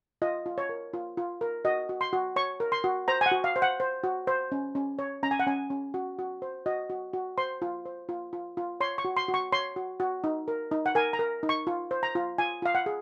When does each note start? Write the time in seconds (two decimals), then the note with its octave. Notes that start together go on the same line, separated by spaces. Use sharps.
0.22 F4 D#5
0.46 F4
0.58 C#5
0.69 A#4
0.93 F4
1.17 F4
1.41 A#4
1.65 F#4 D#5
1.89 F#4
2.01 C6
2.13 F#4
2.36 C#5 C#6
2.60 A#4
2.72 C6
2.84 F#4
3.08 C5 A#5
3.21 G#5
3.26 F#5
3.32 F#4
3.44 F5
3.56 C5
3.62 F#5
3.80 C5
4.04 F#4
4.27 C5
4.52 C#4
4.75 C#4
4.99 C#5
5.23 C#4 A#5
5.31 G#5
5.40 F#5
5.47 C#4 G#5
5.70 C#4
5.94 F#4
6.19 F#4
6.42 C5
6.66 F#4 D#5
6.90 F#4
7.13 F#4
7.38 C5 C6
7.62 F4
7.86 C5
8.09 F4
8.33 F4
8.57 F4
8.81 C#5 C6
8.98 C#6
9.05 F#4
9.17 C6
9.28 F#4
9.34 C#6
9.52 C#5 C6
9.76 F#4
10.00 F#4
10.24 D#4
10.48 A#4
10.71 D#4
10.86 F#5
10.95 A#4 G#5
11.13 A#5
11.19 A#4
11.43 D#4
11.49 C#6
11.67 F4
11.91 C5
12.03 A#5
12.15 F4
12.38 F4 G#5
12.62 F4 F5
12.75 F#5
12.86 G#4